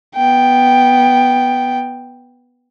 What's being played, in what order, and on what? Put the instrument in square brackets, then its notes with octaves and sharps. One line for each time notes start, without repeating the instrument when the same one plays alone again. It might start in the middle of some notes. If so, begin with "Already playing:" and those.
[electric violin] B3 G5